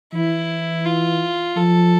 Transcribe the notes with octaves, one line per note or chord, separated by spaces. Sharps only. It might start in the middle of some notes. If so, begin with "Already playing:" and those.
E3 E4
F4
F3 A4